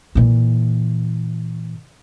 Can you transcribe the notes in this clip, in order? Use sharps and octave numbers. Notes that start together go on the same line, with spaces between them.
A#2 E3